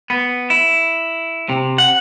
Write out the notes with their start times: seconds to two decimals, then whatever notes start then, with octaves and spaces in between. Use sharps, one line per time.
0.10 B3
0.50 E4
1.49 C3
1.78 F#5